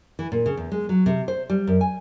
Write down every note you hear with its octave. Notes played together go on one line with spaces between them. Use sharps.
E3
A#2
C#3
E2
G#3
F#3
C3
C5
G3
F#2
G#5